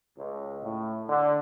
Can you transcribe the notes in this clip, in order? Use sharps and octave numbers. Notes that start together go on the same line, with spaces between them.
C#2
A2
D3